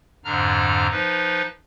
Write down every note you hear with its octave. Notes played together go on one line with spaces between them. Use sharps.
F2 G#2 D3 D4 A#5 F6
F3 D#4 B4